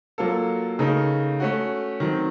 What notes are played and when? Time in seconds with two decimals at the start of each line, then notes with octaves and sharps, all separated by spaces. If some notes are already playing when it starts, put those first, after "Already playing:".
0.18 F#3 A#3 F4 A4
0.79 C#3 A3 D#4 A#4
1.40 A3 C#4 F#4
2.00 D#3 F#3 C4